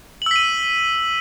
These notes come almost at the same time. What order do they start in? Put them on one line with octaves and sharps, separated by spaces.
F#7 E6 B6 D#7